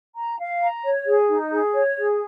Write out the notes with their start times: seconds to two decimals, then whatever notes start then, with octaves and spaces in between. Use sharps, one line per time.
0.15 A#5
0.39 F5
0.62 A#5
0.84 C#5
1.07 G#4
1.29 D#4
1.52 G#4
1.74 C#5
1.97 G#4